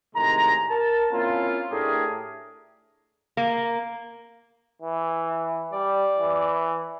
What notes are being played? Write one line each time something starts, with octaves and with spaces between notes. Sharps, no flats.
A2 C3 D#3 G#3 A#5
A#4 A5
A#3 C4 C#4 E4 F4
A2 A3 D4 G4 G#4 A#4
A#3
E3
G3 D5
E3